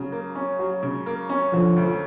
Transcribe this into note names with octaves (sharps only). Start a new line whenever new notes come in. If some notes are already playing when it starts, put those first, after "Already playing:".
Already playing: C#3 F#3
A#3
C#4
F#3
C#3
A#3
C#4
D3 F3
D2